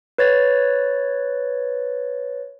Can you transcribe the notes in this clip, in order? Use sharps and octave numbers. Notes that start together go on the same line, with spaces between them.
B4 C#5 A6